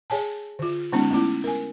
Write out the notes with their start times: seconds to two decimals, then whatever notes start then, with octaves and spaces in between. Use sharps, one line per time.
0.10 G#4 C#5 G#5 A5
0.59 D3 F4
0.92 D3 G#3 B3 C#4 D#4
1.10 A3 B3 C#4 E4
1.44 A#4 G#5